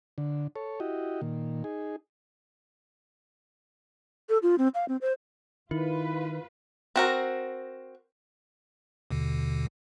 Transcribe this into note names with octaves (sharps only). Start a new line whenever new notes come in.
D3
A4 C#5
E4 F#4 G4 D#5
A#2 D#3
D#4 G#4
A4
F4
C4
F5
C4
C5
D#3 E4 F4 B4
C4 F#4 A#4
D#2 B2 D3